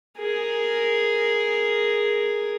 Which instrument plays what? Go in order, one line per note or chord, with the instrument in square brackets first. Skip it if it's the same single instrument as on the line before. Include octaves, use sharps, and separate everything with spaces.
[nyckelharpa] G#4 A#4